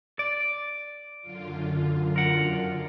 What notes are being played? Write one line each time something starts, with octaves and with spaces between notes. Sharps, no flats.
D5
F#2 D3 F4
A#4 F#5